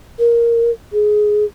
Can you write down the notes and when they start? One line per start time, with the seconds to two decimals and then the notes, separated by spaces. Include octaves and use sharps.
0.19 A#4
0.93 G#4